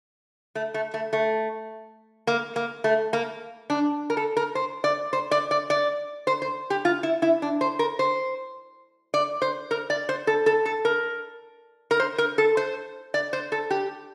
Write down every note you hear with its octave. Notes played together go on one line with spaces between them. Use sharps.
A3
A3
A3
A3
A#3
A#3
A3
A#3
D4
A#4
A4
A#4
C5
D5
C5
D5
D5
D5
C5
C5
G4
F4
E4
E4
D4
C5
A#4
C5
D5
C5
A#4
D5
C5
A4
A4
A4
A#4
A#4
C5
A#4
A4
C5
D5
C5
A4
G4